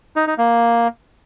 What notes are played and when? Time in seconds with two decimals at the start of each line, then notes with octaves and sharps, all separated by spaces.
0.16 D#4
0.27 D#4
0.38 A#3